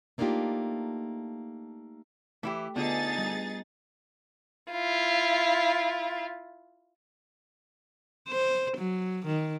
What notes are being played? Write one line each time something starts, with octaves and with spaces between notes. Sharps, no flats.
A3 A#3 D4 D#4 F4 G4
E3 A3 E4 G4
D3 B3 D#4 F4 G#4 A6
G3
E4 F4
C5
F#3
D#3